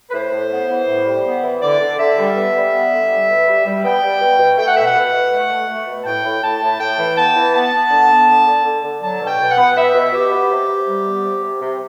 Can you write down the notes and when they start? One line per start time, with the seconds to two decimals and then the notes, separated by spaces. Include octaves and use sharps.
0.09 B4
0.13 A2 C5
0.32 A2
0.51 B3
0.69 E3
0.88 A2
1.06 G3
1.24 B3
1.43 E3
1.61 D3 D5
1.80 D3
1.98 D3 E5
2.18 G3
2.35 B3
2.55 G3
2.73 B3
2.92 D3
3.10 G3
3.28 B2
3.47 G3
3.65 G3
3.84 B3 G5
4.02 G3
4.21 B2
4.39 B2
4.57 A3 G5
4.67 F#5
4.75 B2 E5
4.85 F#5
4.95 B2
5.13 B2
5.32 A3
5.50 A3
5.69 A3
5.87 B2
6.01 A5
6.06 A2 G5
6.24 A2
6.43 A2 A5
6.62 A2
6.80 A2 G5
6.98 E3
7.16 B3 A5
7.36 E3
7.54 B3 A5
7.72 B3
7.90 D3
8.10 B3
8.28 D3
8.47 D3
8.64 D3
8.83 D3
9.02 F#3 A5
9.21 B2
9.26 G5
9.39 B2
9.51 F#5
9.57 B3
9.76 B3 E5
9.94 B2
10.13 B2 G4
10.31 B3
10.51 C3
10.68 C3
10.87 G3
11.06 B3
11.25 C3
11.43 C3
11.61 C3